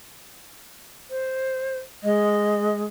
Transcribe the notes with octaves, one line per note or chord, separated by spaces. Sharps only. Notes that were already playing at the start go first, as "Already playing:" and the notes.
C5
G#3 D#5